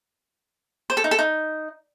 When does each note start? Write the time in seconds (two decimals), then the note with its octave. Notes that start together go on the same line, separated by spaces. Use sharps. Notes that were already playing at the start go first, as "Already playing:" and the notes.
0.90 C5
0.97 A4
1.04 D#4
1.11 A4
1.19 D#4